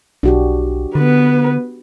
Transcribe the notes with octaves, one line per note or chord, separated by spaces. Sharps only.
B1 D4 F#4 G4
D3 B3 B4